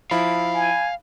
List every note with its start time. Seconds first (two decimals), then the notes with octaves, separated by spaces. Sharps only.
0.11 F3 E4 F5 B5
0.54 G#5